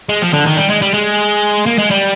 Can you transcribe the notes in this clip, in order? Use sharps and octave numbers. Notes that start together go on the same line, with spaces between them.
G#3
F3
D3
D#3
G3
G#3
G3
G#3
A#3
G#3
G3